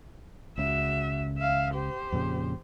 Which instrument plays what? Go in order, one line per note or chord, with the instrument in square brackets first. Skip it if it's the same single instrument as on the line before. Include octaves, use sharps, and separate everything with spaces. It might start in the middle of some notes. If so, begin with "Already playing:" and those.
[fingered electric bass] C#2 C#3 [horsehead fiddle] F#4 E5
[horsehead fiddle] E5 F5
G4 C5
[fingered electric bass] F2 A#2 C#3